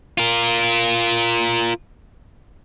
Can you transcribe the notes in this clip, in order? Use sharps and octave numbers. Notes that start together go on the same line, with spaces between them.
F4 A#4